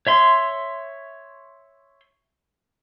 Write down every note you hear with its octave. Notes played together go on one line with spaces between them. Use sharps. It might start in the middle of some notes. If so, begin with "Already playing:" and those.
C#5 E5 C6